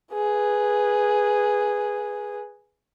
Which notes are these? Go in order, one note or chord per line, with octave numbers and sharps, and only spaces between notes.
G#4 B4